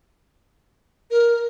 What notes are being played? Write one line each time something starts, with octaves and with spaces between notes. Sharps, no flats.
A#4